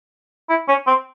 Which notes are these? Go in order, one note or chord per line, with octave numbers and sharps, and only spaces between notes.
E4
C#4
C4